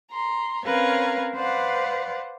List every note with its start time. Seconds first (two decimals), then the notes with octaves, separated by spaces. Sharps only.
0.11 A#5 C6
0.65 C4 C#4 A#4 B4 C#5 F5
1.36 B4 C5 D5 F5 F#5